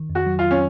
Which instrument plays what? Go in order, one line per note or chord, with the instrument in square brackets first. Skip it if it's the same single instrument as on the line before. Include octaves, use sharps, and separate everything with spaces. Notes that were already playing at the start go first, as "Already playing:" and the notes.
Already playing: [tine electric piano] D#3
F2
[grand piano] F#4
[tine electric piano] F#3
[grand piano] F4
C#4